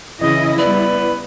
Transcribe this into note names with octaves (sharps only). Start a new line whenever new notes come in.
C#3 E3 E4 D#5
G3 B3 B4 D5